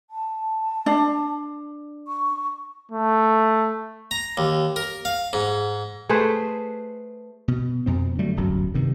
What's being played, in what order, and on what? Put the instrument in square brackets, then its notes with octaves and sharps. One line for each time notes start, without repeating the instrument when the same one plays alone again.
[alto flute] A5
[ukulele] D4
[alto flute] C#6
[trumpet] A3
[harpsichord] A#5
D#2
A#4
F5
G#2
[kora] A3 G#4 B4 C5
[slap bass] B2
F2 B2 C4
D3 F#3 G3 A3
D1 G1 F#2 F#3
G2 C3 D#3